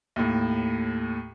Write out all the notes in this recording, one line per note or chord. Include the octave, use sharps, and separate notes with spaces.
D#2 A2